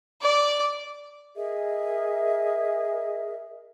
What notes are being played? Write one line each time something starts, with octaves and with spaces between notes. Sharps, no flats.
D5 D6
G#4 A#4 D#5 E5